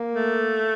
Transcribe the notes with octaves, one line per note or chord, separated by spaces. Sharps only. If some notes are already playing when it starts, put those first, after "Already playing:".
Already playing: A#3
A3